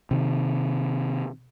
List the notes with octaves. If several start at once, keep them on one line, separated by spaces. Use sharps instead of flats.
C3 D#3